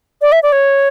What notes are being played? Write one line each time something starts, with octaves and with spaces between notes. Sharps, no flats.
D5
E5
D5
C#5